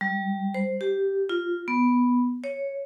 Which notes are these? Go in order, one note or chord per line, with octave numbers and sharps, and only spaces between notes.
G3
C5
G4
F4
B3
C#5